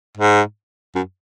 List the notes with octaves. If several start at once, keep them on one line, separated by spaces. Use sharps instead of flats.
G#2
F#2